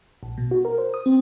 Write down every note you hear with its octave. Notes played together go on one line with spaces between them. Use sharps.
A#1
B2
F#4
A#4
C5
D#6
C4